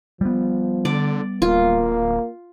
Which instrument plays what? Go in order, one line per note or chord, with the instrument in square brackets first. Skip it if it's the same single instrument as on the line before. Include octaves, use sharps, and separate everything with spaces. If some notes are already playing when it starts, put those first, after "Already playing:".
[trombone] F3 [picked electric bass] G3 B3
[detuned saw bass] D3 [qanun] D5
[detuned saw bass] D1 [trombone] A#3 [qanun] F4